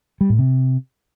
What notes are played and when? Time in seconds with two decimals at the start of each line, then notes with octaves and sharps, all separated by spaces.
0.21 G3
0.30 A2
0.39 C3